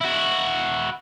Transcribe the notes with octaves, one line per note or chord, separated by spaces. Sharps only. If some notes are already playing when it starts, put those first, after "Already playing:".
E4 F#4